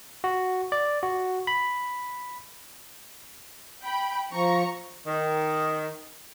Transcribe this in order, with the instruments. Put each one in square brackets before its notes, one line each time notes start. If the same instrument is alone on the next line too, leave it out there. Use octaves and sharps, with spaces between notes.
[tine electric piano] F#4
D5
F#4
B5
[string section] G5 B5
[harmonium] F3 [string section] A#5 C#6
[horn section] D#3